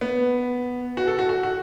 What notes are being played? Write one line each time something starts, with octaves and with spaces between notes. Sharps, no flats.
B3
F#4
A4
F#4
F#4
F#4